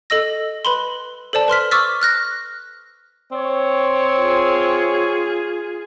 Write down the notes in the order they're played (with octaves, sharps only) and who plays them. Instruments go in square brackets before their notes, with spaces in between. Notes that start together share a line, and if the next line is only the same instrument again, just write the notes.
[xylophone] A4 D#5 E6 A#6
B4 B5 C6
A4 C5 D5 A5
B4 C6 F6 B6
C#6 D6 E6 F6 A6 B6
F6 F#6 A#6
[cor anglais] C4 [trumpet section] C#5
[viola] F4 G#4